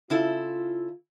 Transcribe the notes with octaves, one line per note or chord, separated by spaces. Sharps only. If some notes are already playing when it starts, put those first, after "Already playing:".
C#3 E4 F4 A4